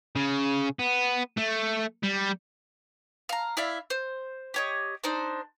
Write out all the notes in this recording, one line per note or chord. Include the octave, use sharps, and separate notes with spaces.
C#3
B3
A3
G3
F5 A#5
E4 D5 E5 F5
C5
G4 C#5 D#5
D4 D#4 C5